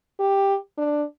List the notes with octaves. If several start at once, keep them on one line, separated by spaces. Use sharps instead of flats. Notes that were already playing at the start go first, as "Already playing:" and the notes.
G4
D4